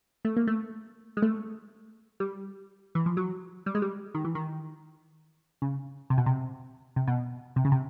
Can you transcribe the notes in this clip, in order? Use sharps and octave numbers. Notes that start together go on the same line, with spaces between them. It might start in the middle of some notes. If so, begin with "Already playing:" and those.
A3
A#3
A3
G#3
A3
G3
E3
F3
F#3
G3
G#3
G3
D#3
E3
D#3
C#3
C3
B2
C3
C3
B2
C3
C#3
C3